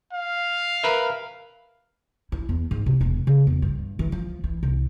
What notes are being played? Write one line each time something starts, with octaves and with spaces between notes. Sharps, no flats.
F5
A#4 B4 E5
E4
E2
G#2
C3
E1
C#3
E2
G2
E3
F3
E3
C2